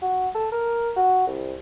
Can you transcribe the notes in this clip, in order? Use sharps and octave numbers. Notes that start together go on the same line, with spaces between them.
F#4
A4
A#4
F#4
C2